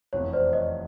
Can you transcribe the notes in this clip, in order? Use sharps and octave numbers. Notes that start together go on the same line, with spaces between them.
F1 E2 C3 C#5
C5 D5
C#5 D#5